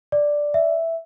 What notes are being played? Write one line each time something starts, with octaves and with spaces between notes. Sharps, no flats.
D5
E5